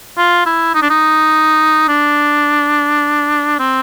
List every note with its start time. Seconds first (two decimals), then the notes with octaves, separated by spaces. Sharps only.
0.18 F4
0.46 E4
0.75 D#4
0.82 D4
0.90 D#4
1.88 D4
3.59 C4